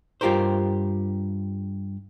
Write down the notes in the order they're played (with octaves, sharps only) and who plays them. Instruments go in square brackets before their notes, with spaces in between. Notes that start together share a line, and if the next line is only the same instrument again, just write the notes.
[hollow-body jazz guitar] G2 F4 G4 A#4 C5